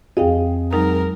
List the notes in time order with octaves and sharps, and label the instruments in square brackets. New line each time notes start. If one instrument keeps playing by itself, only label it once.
[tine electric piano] F2 C4 [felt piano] G#4 [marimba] D#5 F5 G5
[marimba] F#3 G#3 D#4 [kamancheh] A#4